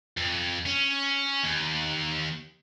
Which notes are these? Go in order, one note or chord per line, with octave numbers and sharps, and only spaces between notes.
F2
C#4
D#2